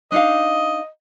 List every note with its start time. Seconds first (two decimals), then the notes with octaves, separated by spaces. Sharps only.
0.12 D4 D#4 D#5 F5